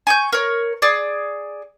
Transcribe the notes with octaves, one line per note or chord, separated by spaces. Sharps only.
G#5 C#6 G6
A#4 C#5
G#4 D5